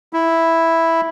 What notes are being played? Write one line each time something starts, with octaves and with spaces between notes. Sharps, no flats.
E4